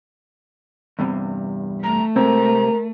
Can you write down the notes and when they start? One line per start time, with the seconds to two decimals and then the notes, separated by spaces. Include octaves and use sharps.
0.99 E2 G2 C3
1.84 A3 A#5
2.16 C3 G#3 C4 A#4 A#5